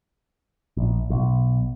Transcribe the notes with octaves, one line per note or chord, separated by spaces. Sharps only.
A#1
B1